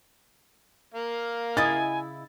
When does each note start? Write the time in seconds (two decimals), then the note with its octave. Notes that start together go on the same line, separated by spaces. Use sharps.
0.94 A#3 F5
1.57 C#3 E4 D#5 G#5 A6